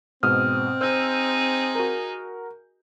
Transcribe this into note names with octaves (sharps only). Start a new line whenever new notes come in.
G#2 B2 C4 D#6 F6
D#4 G#4 C5 E6 G6
F#4 A#4